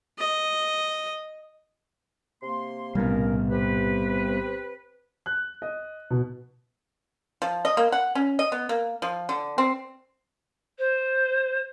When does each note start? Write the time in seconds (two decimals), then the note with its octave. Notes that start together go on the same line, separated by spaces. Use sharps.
0.18 D#5
2.43 C3 A#3 C6
2.95 B1 A2 C3 G3 A#3 B3 C#4 A#4
3.50 C4 G4 B4
5.26 F#6
5.62 D#5
6.10 B2
7.42 F3
7.65 D#5
7.77 A#3
7.92 F#5
8.15 C#4
8.39 D#5
8.52 B3
8.69 A#3
9.02 F3
9.29 D3
9.58 C4
10.78 C5